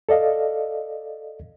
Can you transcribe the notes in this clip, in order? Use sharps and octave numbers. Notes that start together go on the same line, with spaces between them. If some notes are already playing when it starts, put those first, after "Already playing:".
A4 D5 D#5 F5